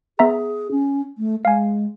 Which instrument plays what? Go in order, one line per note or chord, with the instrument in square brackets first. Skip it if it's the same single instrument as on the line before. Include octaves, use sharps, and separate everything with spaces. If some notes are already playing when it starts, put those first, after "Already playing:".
[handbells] B3 E5 A#5 [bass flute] G#4
[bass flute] C#4
A3
[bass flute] G#3 [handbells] F5 G#5